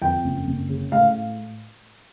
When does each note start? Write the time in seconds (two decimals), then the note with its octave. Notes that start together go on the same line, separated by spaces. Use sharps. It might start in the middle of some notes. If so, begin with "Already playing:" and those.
0.02 F2 G5
0.24 F#1
0.47 F#1
0.69 C#3
0.92 A2 F5